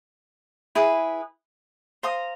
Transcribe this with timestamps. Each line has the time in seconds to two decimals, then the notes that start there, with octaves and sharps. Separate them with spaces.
0.75 E4 G#4 B4
2.03 C5 F5 A#5 D#6